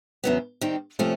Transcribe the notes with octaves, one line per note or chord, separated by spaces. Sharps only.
E2 C#3 F#3 B3
D#3 G3 C4
C3 F3 A3 C#4